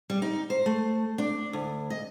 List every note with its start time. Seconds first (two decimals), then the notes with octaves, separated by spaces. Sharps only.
0.10 G3
0.22 D#4
0.50 C5
0.66 A3
1.18 D4
1.53 D2
1.90 D#5